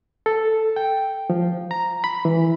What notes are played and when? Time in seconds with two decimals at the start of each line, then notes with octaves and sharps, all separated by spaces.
0.26 A4
0.76 G5
1.30 F3
1.71 A#5
2.04 B5
2.25 E3